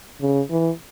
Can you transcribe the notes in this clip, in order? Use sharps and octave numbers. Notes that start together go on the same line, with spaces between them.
C#3
E3